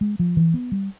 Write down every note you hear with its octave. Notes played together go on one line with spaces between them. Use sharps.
G#3
F3
E3
B3
G3